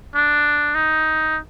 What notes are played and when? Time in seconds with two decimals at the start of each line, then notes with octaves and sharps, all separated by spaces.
0.15 D4
0.75 D#4